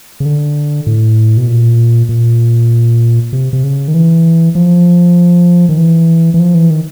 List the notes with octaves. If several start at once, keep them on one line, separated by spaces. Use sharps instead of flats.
C#3
D3
A2
B2
A#2
A#2
C3
C3
C#3
D#3
E3
F3
D#3
E3
E3
F3
E3
D#3